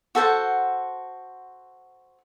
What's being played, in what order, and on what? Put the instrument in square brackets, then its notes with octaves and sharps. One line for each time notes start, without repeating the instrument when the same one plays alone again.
[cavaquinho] F#4 A4 C5 F#5